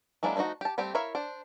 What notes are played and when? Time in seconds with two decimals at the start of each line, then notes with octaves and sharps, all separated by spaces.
0.23 F#3 G#3 A#3 D4 E4
0.36 F3 A3 B3 D#4 F#4
0.61 G4 A5
0.78 G3 A3 C4 G4
0.95 E4 A#4 C#5 E5 F5
1.15 D4 C5